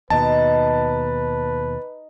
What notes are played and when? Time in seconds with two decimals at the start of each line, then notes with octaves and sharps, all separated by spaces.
0.10 D#2 B2 D#4 B4 A5